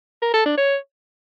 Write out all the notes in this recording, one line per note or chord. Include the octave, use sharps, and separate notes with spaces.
A#4
A4
D4
C#5